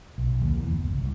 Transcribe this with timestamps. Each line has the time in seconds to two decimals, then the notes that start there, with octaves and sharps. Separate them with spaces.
0.18 B1
0.41 D#2
0.57 E2
0.71 G1
0.84 C#2
0.98 C2